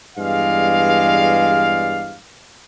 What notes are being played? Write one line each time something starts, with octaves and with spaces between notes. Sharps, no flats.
E2 G2 G#3 D5 F5